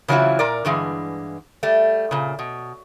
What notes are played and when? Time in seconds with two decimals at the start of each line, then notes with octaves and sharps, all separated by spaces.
0.08 C#3 E3 F#3 C4 E4 F4
0.39 A#2 A#4 D5
0.65 G2 D3 E3 G#3
1.63 G3 A3
2.11 A#2 C#3
2.39 B2